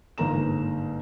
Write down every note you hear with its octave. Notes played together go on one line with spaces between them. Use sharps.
G1 G#2 A#3 A#5 E7